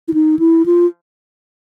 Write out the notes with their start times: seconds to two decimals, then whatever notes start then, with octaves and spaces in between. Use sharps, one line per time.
0.08 E4
0.14 D#4
0.39 E4
0.66 F4